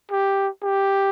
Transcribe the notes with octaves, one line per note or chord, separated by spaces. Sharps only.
G4
G4